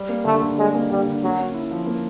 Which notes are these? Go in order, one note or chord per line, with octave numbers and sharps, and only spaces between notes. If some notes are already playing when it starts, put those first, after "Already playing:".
Already playing: G3
A#3
D3 A3
D3
G3 G#3
A#3
D3 G3
D3
F#3 A#3
C#4
E4
F3
A#3